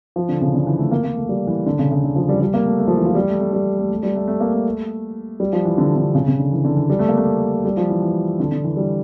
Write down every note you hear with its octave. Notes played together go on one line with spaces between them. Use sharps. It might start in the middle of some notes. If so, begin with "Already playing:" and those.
F3
D3
C#3
D3
E3
A3
A#3
A#3
A3
G3
E3
D3
C#3
C#3
D3
F3
G3
G3
A#3
A3
A3
F3
E3
F3
G3
A3
A3
G3
A3
A3
G3
A3
A3
A#3
A3
G3
F3
E3
D3
D3
C#3
C#3
D3
E3
D3
E3
G3
A3
A#3
A3
G3
F3
E3
E3
D3
D3
E3
G3